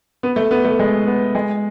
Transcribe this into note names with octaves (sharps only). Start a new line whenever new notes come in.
B3
A3
B3
A3
G#3
B3
G#3